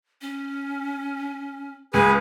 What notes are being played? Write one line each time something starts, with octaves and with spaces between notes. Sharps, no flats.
C#4
C#2 G#4 B4 G#5